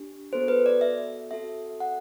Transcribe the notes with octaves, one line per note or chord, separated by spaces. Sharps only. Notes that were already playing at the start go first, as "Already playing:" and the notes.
Already playing: D4 G4
B3 F#4 A4 C5
B4
D5
E5
C4 F#4 A4 E5
F#5